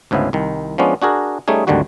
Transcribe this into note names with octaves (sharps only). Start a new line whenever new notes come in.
D2 G#2 C#3 B3 E4
C2 D#3
F3 G#3 B3 C#4 D4
D4 F#4 G#4 A#4
G3 A3 C#4 D#4 G#4
G#1 D2 D3 D#3 G3 F#4